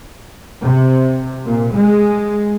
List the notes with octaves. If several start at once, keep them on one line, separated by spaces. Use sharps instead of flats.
C3
A#2
G#3